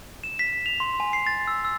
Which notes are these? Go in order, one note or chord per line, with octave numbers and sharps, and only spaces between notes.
E7
B6
F7
C6
G#5
C7
A6
E6
E6